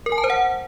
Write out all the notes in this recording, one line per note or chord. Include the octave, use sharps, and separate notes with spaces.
A#4
G#5
A5
C5
F#5